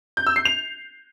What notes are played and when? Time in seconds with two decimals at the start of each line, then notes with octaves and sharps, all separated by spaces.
0.17 G6
0.27 E6
0.36 C7
0.45 F7